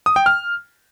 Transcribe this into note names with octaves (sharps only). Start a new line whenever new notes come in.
D#6
G5
F6